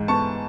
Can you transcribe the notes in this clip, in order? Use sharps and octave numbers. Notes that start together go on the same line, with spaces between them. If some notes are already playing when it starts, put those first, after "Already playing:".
Already playing: G#2 E3
B3 A5 C#6